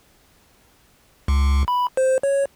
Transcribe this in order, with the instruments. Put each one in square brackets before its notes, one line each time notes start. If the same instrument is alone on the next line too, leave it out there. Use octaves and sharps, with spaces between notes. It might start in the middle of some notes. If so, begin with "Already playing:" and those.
[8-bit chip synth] C#2
B5
C5
C#5